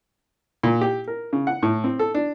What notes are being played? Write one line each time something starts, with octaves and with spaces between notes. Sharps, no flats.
A#2
G4
A#4
C#3
F#5
A2
C4
A4
D4